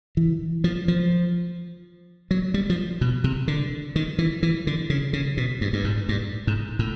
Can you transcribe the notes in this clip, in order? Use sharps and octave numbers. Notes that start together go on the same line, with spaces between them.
E3
F3
F3
F#3
G3
F3
B2
C3
D3
D#3
E3
E3
D3
C#3
C#3
B2
G2
G2
G#2
G2
G#2
A2